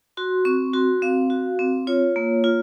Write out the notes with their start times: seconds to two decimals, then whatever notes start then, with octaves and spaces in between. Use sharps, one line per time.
0.17 F#4 C6
0.45 C4 C#6
0.73 F#4 C6
1.02 C4 F5
1.30 F#4
1.59 C4
1.87 F4 C#5
2.16 A#3
2.44 F4